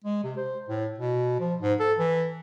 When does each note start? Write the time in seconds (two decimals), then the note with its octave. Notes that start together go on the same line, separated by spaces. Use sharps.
0.04 G#3
0.24 C3
0.37 C5
0.68 A2
0.98 B2
1.40 F3
1.60 G#2
1.79 A4
1.99 E3